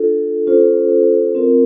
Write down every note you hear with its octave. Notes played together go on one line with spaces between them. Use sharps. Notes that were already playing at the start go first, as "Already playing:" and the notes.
Already playing: D4 F4 A4
C#4 F4 A4 C5
C4 F4 A#4